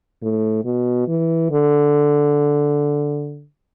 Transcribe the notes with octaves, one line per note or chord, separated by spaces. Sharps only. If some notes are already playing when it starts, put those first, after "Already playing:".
A2
B2
E3
D3